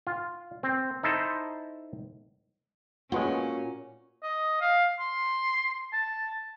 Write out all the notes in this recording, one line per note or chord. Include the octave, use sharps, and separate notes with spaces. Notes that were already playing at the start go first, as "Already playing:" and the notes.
F4
C4
D#4 E4 A4 C5
A#2 G#3 B3 C#4 F4 F#4
D#5
F5
C6
A5